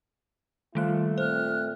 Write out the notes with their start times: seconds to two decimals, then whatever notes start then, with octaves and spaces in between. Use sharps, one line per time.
0.75 D#3 F3 G3 A3 A#3 F4 F#6
1.18 A#2 C4 C5 F6 F#6